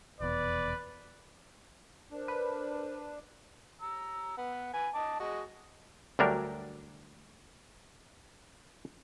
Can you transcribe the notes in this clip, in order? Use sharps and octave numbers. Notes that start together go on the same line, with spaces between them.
F1 E2 B2 B4 D5
D4 A#4 C5
B4
A#5 E6
B3 F#5
B4 G#5
D#5 A5 D6
G#3 F#4 D#5
D2 F#3 G3 D4 A#4